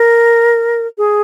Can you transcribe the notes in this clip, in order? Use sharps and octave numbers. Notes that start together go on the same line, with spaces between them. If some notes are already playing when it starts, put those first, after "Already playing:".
Already playing: A#4
G#4